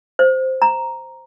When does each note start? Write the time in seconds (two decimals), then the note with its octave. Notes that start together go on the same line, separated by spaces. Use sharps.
0.19 C5
0.62 A#5